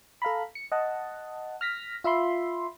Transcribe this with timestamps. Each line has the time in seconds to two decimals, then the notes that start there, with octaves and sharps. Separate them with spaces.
0.22 A4 F5 A#5 B5
0.55 C#7
0.72 D#5 F#5 A5
1.61 F6 A#6 B6
2.04 F4 E5 B5 C6